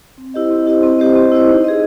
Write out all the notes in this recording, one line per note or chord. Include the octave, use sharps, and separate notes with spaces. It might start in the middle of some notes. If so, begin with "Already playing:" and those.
C4
E4 G4 C5 D#5
C4
E4 G4 C5 D#5
C4
E4 G4 C5 D#5
C4
E4 G4 C5 D#5
D#4
G#4 B4 D#5